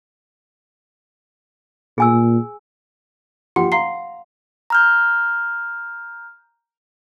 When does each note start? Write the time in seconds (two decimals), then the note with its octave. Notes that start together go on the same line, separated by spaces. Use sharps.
1.98 A#2 G#4 G#5 E6
3.56 F3 G4 F#5 C6
3.72 F5 A#5 C6 C7
4.70 A#5 F6 G6